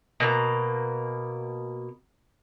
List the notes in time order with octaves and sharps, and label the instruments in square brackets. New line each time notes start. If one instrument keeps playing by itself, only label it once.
[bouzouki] B2 A#3 G#4 A#5